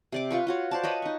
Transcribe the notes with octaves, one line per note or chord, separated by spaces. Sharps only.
C3 D5 D6
F4 B4 C#6
F4 F#4 C#5
C5 D5 A5
B4 C#5 D#5 B5
D#4 C#6